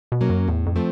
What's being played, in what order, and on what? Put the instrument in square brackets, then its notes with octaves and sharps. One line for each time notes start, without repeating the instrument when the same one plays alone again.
[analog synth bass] B2
[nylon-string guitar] F#3 A#3 C#4
[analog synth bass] F#2
[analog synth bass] E2 [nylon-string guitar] A2
[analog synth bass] F2
[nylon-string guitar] F3 A3 C4